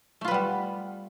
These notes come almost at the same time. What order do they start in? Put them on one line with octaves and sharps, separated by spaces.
A3 F4 B4 G3 B3